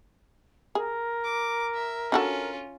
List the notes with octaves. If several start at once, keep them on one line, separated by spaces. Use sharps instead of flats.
G#4 A#4
D6
E5
C#4 D4 F4 F#4 A4